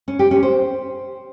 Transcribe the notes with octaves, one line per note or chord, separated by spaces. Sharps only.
C#4
G4
C#4
C5